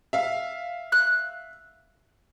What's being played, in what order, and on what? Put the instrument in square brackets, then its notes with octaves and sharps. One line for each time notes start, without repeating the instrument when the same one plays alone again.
[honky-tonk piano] E5 F5
[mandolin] F#6